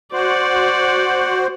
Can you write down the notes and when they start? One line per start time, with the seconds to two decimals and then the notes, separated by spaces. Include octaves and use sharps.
0.13 F#4 C5 D5 F#5